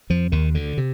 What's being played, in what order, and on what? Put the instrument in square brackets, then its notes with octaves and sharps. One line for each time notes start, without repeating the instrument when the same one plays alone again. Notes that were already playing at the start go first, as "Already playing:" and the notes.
[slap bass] F2 F3
D#2 D#3
D2 D3
C3